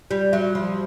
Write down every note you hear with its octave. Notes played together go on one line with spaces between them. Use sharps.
G3 F4
F#3 E5
F3 F4